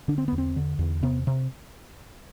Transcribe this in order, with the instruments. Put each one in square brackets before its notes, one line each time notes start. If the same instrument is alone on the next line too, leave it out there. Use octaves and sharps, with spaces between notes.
[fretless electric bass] D3 D4
C4
E2 B3
C4
D3
E2
C3 B3
C3